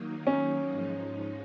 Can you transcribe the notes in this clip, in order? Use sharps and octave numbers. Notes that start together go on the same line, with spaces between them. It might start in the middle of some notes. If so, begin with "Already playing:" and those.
Already playing: D#3 F#3 A#3 D#4
C#4
G#2 F3 G#3 D#4